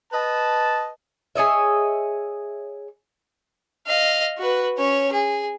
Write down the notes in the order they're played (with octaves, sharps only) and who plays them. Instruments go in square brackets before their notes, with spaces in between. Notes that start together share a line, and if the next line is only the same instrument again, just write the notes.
[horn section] B4 D#5 A5
[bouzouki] G#4 C#5 D#5 E5
[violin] D#5 F5
F#4 B4
C#4 C#5
G#4